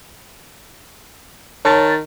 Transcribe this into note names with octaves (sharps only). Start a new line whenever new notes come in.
D#3 C#5 A5 A6